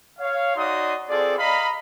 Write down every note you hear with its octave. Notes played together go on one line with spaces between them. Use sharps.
C#5 F5
D#4 F#4 C#5 D5 C6 D#6
C4 F4 G#4 A4 D5
D#5 F5 A#5 B5